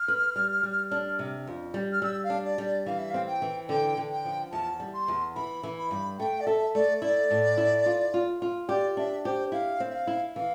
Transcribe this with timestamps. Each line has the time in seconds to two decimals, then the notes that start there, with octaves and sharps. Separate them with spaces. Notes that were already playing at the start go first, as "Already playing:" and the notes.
Already playing: F6
0.08 B4
0.36 G3
0.63 G3
0.91 D4
1.19 C3
1.47 F2
1.74 G3
1.93 F6
2.02 G3 E6
2.24 F5
2.30 D4
2.45 D5
2.58 G3
2.65 D5
2.86 E3 F5
2.99 E5
3.11 C4 F5
3.27 G5
3.42 E3
3.69 D3 G5
3.97 D3
4.10 G5
4.25 F3
4.52 E2 A5
4.80 G3
4.94 C6
5.08 E2
5.35 E3 B5
5.63 E3
5.78 B5
5.91 G2
6.19 A3 G5
6.40 D5
6.46 A4 E5
6.74 A3 D5
7.02 E4 D5
7.31 A2
7.58 E4
7.86 F4
8.14 F4
8.42 F4
8.68 G4 D5
8.97 D4 E5
9.25 G4 C5
9.52 E4 F5
9.80 C4
9.90 E5
9.94 F5
10.07 E4
10.35 E3 F5